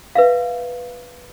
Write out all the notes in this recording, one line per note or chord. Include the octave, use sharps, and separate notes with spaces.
B4 E5 F5